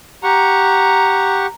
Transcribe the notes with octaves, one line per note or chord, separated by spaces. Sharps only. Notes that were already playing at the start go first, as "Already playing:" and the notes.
G4 F#5 A#5 C#6